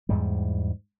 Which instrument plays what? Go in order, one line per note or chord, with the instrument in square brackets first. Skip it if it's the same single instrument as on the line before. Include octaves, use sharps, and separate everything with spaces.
[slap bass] E2 G#2 G3